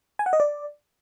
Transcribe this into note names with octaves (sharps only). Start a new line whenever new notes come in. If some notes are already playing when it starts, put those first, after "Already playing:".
G#5
F#5
D#5
D5